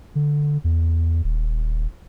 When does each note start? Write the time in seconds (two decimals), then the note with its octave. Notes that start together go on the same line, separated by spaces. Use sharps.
0.15 D3
0.64 E2
1.24 D#1